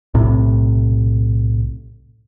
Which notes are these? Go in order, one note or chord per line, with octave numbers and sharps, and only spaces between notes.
B1 A2 C3